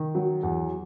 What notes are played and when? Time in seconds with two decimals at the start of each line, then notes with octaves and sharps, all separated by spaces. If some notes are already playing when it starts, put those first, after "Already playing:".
Already playing: D#3
0.15 F#3
0.43 E2